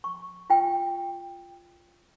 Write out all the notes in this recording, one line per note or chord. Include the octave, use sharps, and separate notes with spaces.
C#6
F4 G5